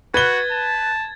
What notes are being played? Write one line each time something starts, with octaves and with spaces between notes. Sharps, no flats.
F#4 B4 G#6 A6 G7
A5